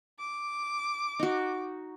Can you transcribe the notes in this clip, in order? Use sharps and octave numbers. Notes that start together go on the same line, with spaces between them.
D6
D#4 F#4